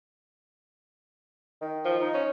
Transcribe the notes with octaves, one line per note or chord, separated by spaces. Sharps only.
D#3
F3
D#4
C#4